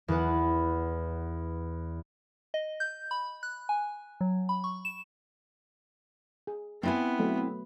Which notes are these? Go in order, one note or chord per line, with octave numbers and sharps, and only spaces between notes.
E2 E3 B4 F#5
D#5
G6
B5
F#6
G#5
F#3
B5
C#6
E7
G#4
B3 C4 E4 G#5
F#3 A3